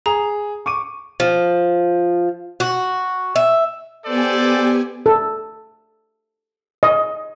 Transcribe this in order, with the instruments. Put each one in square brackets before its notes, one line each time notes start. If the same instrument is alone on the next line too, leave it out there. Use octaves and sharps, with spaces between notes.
[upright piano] G#4 [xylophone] A#5
[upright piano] C#6 D6 D#7
[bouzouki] F3
F#4
E5
[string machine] B3 G4 G#5 [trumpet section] A4 C5 D5
[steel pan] A4
D#5